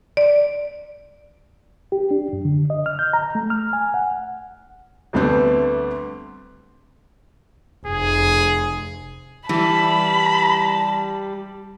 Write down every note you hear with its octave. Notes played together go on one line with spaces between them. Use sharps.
D5
G4
D4
F#2
D3
D#5
F6
G6
A#5
A3
F6
G#5
F#5
D2 D3 G3 A3 B3 C4
F1 G#4
E3 G3 A5 B5